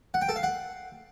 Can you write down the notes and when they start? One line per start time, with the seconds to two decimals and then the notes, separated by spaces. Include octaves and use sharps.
0.14 F#5
0.21 G5
0.29 A4
0.36 F5
0.43 F#5